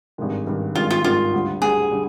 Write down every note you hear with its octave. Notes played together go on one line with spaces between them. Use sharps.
G#1 G2 D#3 G#3
G#1 G2 D#3 G#3
G#1 G2 D#3 G#3 F4
F4
G#1 G2 D#3 G#3 F4
D2 D3 G3
D2 D3 G3 G#4
D3 G3